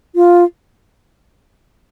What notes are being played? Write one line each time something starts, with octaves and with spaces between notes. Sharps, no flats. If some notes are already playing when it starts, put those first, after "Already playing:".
F4